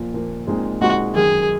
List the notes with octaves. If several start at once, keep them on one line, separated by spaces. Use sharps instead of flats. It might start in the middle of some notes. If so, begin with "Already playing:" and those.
Already playing: A#2 F3 A#3
A#2 F3 A#3
A#2 G#3 C4 D#4 G#4
A#2 G#3 C4 D#4 F#4 G#4
F#2 D#3 G#3 G#4